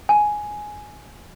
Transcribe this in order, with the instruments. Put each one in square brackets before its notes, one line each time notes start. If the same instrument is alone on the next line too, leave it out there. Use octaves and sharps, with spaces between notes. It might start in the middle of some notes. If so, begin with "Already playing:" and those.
[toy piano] G#5